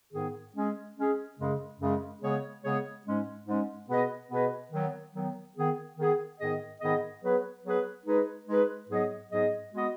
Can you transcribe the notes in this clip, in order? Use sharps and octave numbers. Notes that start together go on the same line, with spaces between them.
G#2 D#3 B3 G#4
G#3 C#4 G#4
G#3 C#4 G#4
F#2 C#3 G#3
F#2 C#3 G#3
C#3 G#3 B3 G#4 C#5
C#3 G#3 B3 G#4 C#5
G#2 G#3 C#4
G#2 G#3 C#4
B2 B3 G#4 B4 D#5
B2 B3 G#4 B4 D#5
D#3 F#3 B3
D#3 F#3 B3
D#3 B3 G#4
D#3 B3 G#4
G#2 D#3 B3 G#4 D#5
G#2 D#3 B3 G#4 D#5
F#3 B3 G#4 B4
F#3 B3 G#4 B4
G#3 D#4 G#4 B4
G#3 D#4 G#4 B4
G#2 F#3 B3 G#4 D#5
G#2 F#3 B3 G#4 D#5
G#3 B3 F#4 D#5